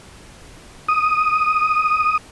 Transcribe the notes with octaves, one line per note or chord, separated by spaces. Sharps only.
D#6